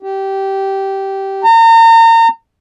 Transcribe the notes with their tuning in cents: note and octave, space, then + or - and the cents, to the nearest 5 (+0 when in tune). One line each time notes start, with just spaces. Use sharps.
G4 -15
A#5 -35